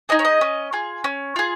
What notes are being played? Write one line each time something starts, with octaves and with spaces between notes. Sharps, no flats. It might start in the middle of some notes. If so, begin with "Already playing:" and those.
D#4 G#4 D#5
C#5
D#5
C#4
F4 G#4
C#4
F4 G#4